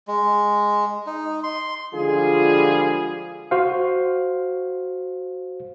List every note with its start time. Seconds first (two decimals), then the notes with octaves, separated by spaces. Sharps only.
0.08 G#3
1.07 D#4
1.44 C6
1.94 D3 F3 G3 G#3 F4 G#4
3.51 F#4 C5 F5